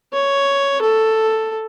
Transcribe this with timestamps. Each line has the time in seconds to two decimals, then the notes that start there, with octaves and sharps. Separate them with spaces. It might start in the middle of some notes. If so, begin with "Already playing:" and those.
0.13 C#5
0.82 A4